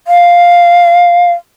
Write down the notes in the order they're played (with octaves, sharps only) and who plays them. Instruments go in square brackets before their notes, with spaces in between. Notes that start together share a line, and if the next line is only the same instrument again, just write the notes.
[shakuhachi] F5